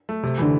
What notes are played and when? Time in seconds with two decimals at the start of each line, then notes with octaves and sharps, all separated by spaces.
0.09 A3
0.23 C3
0.38 D3 E3